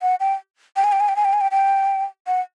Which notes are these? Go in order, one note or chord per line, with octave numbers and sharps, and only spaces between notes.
F#5
G5
G5
G#5
G5
G#5
G5
G#5
G5
G#5
G5
G5
F#5